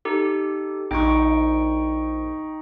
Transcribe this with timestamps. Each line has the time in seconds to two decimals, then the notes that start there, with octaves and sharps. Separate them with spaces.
0.05 D#4 G4 A4
0.91 A#1 D#4 G5 C#6